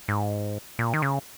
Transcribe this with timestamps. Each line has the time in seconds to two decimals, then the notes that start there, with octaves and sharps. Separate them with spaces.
0.08 G#2
0.79 A#2
0.94 D#3
1.02 C#3